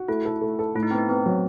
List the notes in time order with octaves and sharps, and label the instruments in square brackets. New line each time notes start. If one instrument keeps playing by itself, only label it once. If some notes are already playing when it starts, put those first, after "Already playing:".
Already playing: [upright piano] F#4
[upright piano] A3 [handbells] E4
[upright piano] A4
A3
A4
[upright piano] A2 [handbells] E4
[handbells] D#4
[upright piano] B3 [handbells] C4
[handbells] D#4
[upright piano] B3 [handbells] C4
[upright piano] F#3